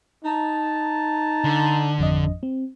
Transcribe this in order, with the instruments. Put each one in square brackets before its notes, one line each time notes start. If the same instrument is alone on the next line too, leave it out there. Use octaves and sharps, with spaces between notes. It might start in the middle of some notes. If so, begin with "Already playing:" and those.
[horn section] D#4 A5
[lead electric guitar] D3
[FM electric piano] G#1 F2 D#5
C4